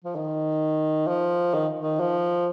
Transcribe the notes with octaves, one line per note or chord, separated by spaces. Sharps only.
F3
D#3
F3
D#3
D#3
F3